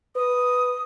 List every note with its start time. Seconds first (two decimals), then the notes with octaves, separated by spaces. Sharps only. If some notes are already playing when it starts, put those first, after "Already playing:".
0.16 B4 D#6